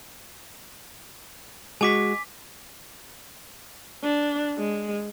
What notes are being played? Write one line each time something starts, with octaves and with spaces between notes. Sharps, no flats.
G#3 F#4 G#5 D6 B6
D4
G#3